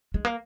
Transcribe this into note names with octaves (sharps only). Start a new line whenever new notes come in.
G#3
A#3